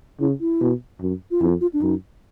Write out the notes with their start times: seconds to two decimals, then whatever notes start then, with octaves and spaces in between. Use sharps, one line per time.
0.20 C#3 E4
0.40 E4
0.61 B2
1.00 F#2
1.31 F4
1.41 F2 E4
1.61 F4
1.73 D4
1.82 F#2 D#4